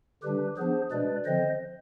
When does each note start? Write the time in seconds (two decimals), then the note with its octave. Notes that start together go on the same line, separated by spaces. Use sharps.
0.23 D3 G3 D4 G4 B4
0.57 F3 B3 D4 G#4 C5
0.92 B2 G#3 D4 B4 D5
1.25 D3 F3 C4 C5 D#5